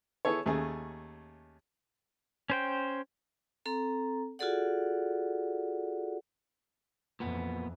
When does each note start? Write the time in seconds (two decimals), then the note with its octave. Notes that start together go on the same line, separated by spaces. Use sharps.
0.25 B3 E4 G#4 A4 C#5
0.46 D#2 A3 C#4 G#4
2.50 C#4 C5 G5
3.66 C4 A4 A#5
4.39 F4 F#4 G#4 A4 D5 F#5
7.20 F2 A#2 E3 B3